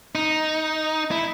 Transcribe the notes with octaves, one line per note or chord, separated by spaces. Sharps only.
D#4
E4